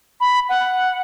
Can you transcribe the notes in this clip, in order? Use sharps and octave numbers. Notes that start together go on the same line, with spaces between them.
B5
F#5